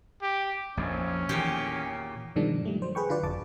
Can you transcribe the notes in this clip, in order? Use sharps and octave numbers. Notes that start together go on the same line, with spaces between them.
G4
A#1 F2 C#4
E2 A#2 D#3 G4
G2 B2 D#3 F3 G#3 D4
G3 A3
F#3 C5
G#4 B4 G5 C#6
D3 F4 F#4 B4 D5
G1 F2 A5 D6